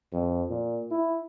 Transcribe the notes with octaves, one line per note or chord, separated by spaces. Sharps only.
F2
A#2
E4